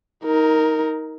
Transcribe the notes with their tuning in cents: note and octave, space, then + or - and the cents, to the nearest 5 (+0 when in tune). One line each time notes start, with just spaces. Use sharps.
D#4 +25 A#4 +0